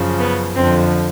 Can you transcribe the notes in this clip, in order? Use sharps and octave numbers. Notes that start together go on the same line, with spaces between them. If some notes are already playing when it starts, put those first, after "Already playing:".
Already playing: F#2 C#3 F3
B3
F2 D3 F3 C4